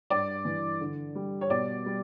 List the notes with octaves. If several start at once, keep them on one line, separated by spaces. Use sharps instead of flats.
G2 D5
E3
D3
G3
C#5
B2 D5
G3